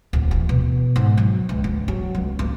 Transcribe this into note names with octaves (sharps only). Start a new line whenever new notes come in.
D1
E3
B2
G#2
F#3
C#2
D2
F#3
C#2
A#3